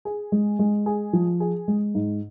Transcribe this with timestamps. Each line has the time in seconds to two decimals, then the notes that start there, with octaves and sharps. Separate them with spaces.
0.05 G#4
0.32 G#3
0.59 G#3
0.86 G#4
1.13 F3
1.40 G#4
1.68 G#3
1.95 G#2